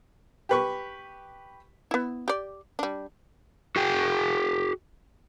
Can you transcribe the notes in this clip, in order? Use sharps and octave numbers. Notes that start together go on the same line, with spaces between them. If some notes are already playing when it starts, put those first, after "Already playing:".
G4 B4 C#6
B3 E4
G4 D5
G3 D4
F#4 G#4 G5